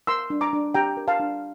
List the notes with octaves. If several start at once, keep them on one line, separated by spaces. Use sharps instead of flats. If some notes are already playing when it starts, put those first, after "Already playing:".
A#4 C6 E6
D4
A#5 D6
D4
G4 G5 A#5
A#4
F5 A5
D4